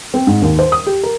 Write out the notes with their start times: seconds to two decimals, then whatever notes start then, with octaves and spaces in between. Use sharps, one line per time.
0.14 C4
0.27 G#2
0.42 D#2
0.59 C5
0.72 D#6
0.87 G4
1.03 A#4